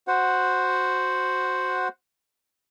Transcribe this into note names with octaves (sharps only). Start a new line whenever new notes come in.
F#4 C5 F#5